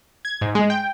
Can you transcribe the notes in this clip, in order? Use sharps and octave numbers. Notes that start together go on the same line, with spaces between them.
G#6
G#2
G#3
G5